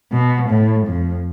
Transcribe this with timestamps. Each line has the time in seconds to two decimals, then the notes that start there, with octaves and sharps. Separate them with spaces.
0.12 B2
0.49 A2
0.87 F2